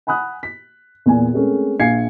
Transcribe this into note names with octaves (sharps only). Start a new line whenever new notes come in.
F#5 G#5 B5 D#6 F#6
B6
E2 A#2 G#5
G#3 A3 C4 C#4 G#4 A#4
A#1 F5 G#5 G#6 C7 C#7